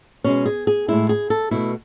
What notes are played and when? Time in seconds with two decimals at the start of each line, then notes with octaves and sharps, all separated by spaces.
0.24 B2 G#3 C#4
0.46 G#4
0.67 G#4
0.88 A2 G#3 E4
1.09 G#4
1.30 A4
1.51 B2 A3 E4